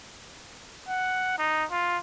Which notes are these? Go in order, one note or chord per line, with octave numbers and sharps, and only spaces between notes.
F#5
D#4
F4